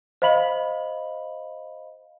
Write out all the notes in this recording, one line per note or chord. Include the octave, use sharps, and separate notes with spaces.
C5 D#5 F5 B5 F#7